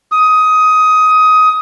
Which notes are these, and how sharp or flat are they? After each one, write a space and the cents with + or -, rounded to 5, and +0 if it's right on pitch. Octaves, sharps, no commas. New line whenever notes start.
D#6 +15